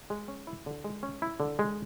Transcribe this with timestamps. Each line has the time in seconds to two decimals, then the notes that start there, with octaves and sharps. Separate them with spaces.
0.10 G#3
0.28 C#4
0.47 E4
0.66 D3
0.84 G#3
1.03 C#4
1.22 E4
1.40 D3
1.59 G#3